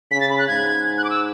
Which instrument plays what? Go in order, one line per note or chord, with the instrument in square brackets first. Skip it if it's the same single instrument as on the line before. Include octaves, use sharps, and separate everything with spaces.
[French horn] C#3 [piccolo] B6
[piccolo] A6
B5
F#6
[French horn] G#2 [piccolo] G#6
[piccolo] F#6
D6
E6